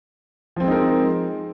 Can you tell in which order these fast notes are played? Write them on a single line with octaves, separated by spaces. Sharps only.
F3 C4 G#3 D#4 A#4